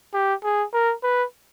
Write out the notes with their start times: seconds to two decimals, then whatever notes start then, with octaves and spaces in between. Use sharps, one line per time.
0.13 G4
0.43 G#4
0.73 A#4
1.03 B4